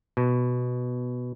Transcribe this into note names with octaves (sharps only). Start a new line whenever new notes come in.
B2